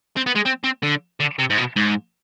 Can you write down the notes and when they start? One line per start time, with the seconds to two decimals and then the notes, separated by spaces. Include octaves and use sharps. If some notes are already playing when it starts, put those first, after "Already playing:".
0.17 C4
0.26 B3
0.35 G#3
0.45 C4
0.64 C4
0.83 D3
1.20 D3
1.39 C3
1.50 G#2
1.58 B2
1.76 G#2